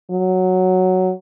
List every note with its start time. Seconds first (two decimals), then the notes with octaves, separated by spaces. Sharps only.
0.11 F#3